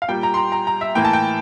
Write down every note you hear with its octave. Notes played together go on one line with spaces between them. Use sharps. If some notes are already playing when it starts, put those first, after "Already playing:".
F5
A#2 G3 A#3 G5
A#5
C6
A#5
A#5
A#5
E5
A2 E3 A#3 G5
A5
G5